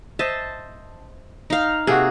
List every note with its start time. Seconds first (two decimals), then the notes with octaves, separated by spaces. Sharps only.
0.19 C5 D#5 E5 A5
1.50 D#4 F5
1.87 C3 A#3 F#4 G#4